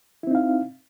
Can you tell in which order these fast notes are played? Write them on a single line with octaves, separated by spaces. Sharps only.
E4 C4 D#4 F5